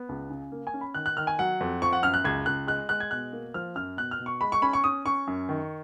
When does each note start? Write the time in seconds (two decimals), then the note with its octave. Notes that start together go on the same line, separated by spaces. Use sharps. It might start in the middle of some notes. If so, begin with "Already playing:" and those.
Already playing: B3
0.09 C#2
0.30 C#3
0.52 A#3
0.67 G#5
0.74 C#4
0.81 B5
0.95 D#3 F#6
1.06 F#6
1.17 D#3 F6
1.27 G#5
1.39 F#3 F#5
1.61 F2
1.82 F3 C#6
1.93 F#5
2.03 F#2 F6
2.14 F#6
2.24 C#2 G#6
2.46 C#2 F#6
2.67 G#3 F#6
2.89 G#3 F#6
3.00 G#6
3.11 B2 F#6
3.33 A#3
3.54 F3 F6
3.75 F#2 F6
3.97 B2 F#6
4.11 F6
4.19 B2
4.26 C#6
4.41 G#3 B5
4.52 C#6
4.62 C#4 B5
4.73 C#6
4.84 C#4 D#6
5.05 C#4 C#6
5.27 F#2
5.49 D#3